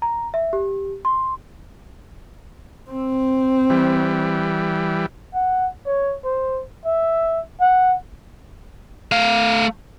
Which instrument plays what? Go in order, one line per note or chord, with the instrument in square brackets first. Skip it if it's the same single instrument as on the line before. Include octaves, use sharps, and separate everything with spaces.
[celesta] A#5
E5
G4
C6
[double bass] C4
[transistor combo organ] E3 G3
[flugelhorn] F#5
C#5
C5
E5
F#5
[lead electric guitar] A3 F5